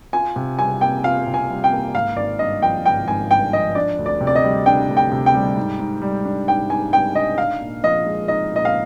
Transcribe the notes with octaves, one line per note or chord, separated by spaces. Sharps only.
F4 G#5
C3
G3 G#5
A#3 G5
F4 F5
C3
G#5
G3
G5
A#3
G#1 F5
G#1 D5
G2 D#5
F3 G5
G#1 G5
G#1 G#5
G2 G5
F3 D#5
D4 D5
D2
D5
C3
D5
D#5
G3
D4 G5
D2
G5
C3
G5
G3
G#2
G#2
G3
D4
G#2 G5
G#2 G#5
G3 G5
D4 D#5
D#4 F5
A#2
F3 D#5
G#3
D#4 D#5
A#2 D#5
F5